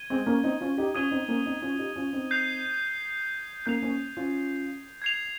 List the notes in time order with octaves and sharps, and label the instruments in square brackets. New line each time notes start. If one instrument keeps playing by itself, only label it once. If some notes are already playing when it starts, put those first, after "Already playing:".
Already playing: [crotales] G#6 D#7 G7
[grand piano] G#3 C4
A#3 C#4
C4 D#4
C#4 F4
D#4 G4
[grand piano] C#4 F4 [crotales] D#6 G#6 D#7 G7
[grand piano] C4 D#4
A#3 C#4
C4 D#4
C#4 F4
F4
D#4 G4
C#4 F4
C4 D#4
[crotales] G6 C7 F7
[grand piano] A#3 C#4 [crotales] G6 C7 F7
[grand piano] A#3 C#4
C#4 F4
[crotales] G#6 C7 F7